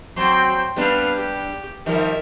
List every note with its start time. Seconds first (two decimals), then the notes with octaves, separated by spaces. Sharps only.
0.16 F#3 C4 G5 C6
0.76 G3 B3 D4 F5
1.16 G4
1.86 D#3 F3 G3 A#4 E5